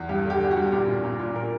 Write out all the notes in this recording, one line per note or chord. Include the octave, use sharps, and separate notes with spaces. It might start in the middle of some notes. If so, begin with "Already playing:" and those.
Already playing: E2
G2 G4
D3
G4
D3 G4
F#4
G2
A#2 G4
A#2
A#2
A#2
A#4